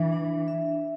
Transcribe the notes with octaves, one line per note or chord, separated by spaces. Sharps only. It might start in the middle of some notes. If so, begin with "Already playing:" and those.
Already playing: E3 D4 E5
D4
E5